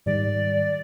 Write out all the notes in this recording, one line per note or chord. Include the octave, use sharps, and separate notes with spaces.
G#2 D#3 G3 D5